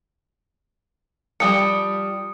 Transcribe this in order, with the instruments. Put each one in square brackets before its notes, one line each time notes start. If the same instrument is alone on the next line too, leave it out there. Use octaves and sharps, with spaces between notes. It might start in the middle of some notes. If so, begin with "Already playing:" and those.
[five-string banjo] F3 G3 [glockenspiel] D#6 C#7